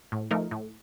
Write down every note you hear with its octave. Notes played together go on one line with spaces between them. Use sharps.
A2
F3 A3 D#4 A#4
A2